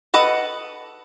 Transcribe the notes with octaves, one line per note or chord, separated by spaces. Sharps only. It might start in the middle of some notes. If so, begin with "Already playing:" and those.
A4 B4 D#5 F#5